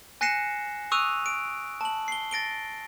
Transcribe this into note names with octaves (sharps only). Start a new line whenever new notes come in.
G#5 F#6 A#6 C7 C#7 E7
C#6 D#6 E6 F#6 D#7 F7
D7
A5 F#7
C7 G7
A6 A#6 D7 G7